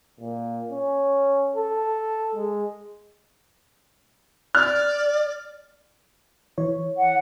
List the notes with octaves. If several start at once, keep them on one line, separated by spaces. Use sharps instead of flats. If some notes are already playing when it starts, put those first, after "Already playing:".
A#2
C#4
A4
G#3
D5 F6
E3 C#5
F#5